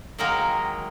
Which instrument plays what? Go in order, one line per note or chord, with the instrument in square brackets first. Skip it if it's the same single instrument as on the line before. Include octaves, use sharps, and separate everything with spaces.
[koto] D#3 F#3 G#3 A#3 A#4 G5